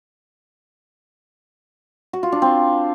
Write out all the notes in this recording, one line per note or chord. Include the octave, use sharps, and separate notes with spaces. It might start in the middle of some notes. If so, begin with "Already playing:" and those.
F#4
F4
D4
C4